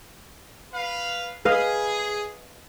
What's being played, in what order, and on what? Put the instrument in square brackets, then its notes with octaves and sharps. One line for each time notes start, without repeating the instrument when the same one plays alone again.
[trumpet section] B4 F5
[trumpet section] G#4 [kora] B4 D#5 F5